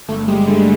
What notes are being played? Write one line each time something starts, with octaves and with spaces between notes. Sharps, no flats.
G1 A3
G3 G#3
D3 A3